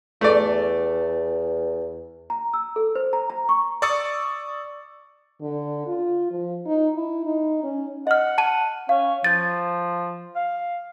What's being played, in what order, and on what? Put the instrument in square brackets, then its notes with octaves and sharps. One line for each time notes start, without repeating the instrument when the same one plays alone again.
[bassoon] E2 [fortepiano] A3 D5
[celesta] A#5
E6
A4
C5
A#5
A#5
C#6
[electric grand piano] D5 C#6 D#6 E6 A6 C#7
[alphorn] D3
F4
F3
D#4
E4
D#4
C#4
[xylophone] D#5 F6 [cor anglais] F#5
[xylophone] A5 D#7
[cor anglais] C#4 [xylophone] F5
[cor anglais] F3 [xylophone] G6 A6
[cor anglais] F5